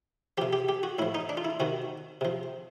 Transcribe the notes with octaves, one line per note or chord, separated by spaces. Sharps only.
C3 F3 G4
G4
G4
F#4
A2 F3 E4
D#4
D4
F4
E4
C3 D#3 F#4
C3 F3